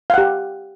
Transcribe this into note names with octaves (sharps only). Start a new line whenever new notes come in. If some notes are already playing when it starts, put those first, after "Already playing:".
G4 F5 F#5